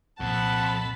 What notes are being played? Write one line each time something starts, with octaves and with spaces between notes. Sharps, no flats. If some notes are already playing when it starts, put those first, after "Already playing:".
C2 F2 A#2 F#5 A5 B5